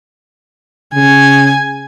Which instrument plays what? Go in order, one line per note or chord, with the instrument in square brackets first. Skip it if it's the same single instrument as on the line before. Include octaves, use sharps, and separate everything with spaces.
[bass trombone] C#3 [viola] G#5